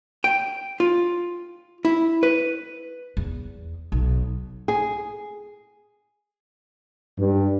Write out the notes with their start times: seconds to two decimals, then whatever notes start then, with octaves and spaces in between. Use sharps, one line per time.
0.24 G5
0.80 F4
1.85 E4
2.23 B4
3.17 E2
3.92 B1
4.68 G#4
7.19 G2